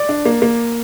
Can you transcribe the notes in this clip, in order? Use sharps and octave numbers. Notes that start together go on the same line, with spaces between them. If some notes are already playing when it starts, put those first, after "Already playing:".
Already playing: D5
D4
A#3
A#3